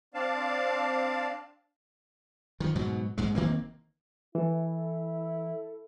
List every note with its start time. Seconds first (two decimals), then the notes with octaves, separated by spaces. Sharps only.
0.14 C4 D4 D5 F5 A5
2.60 D#3 F3
2.76 G#2 B2 F#3
3.18 A#1 G#2 G#3
3.35 F1 D#3 A#3 C4
4.35 E3 E4 A4